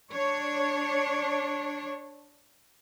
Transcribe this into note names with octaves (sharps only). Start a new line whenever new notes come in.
D4 C#5